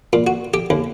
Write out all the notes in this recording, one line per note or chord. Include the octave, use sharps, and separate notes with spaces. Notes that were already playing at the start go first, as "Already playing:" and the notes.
A#2
F#4
G4
D#2